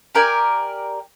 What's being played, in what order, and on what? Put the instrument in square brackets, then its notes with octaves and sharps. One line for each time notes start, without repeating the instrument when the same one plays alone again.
[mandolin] G4 A#4 D5 G#5